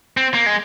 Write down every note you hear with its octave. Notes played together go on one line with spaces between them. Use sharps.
C4
A#3
G#3